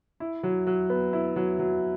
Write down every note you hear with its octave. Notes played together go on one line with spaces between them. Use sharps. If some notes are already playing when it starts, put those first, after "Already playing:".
E4
F#3
F#3
B3
E4
F#3
F#3